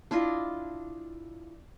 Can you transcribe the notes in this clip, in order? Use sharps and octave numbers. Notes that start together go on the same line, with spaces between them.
D4 E4 F4 D#5